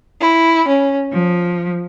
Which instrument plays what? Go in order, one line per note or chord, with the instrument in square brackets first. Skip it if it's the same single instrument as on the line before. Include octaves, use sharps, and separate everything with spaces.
[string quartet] E4
C#4
F3